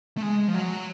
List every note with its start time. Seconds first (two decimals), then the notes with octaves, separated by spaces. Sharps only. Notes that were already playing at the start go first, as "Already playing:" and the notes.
0.17 A3
0.22 G#3
0.48 F3
0.54 F#3